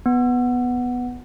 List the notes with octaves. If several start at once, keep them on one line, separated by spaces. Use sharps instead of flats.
B3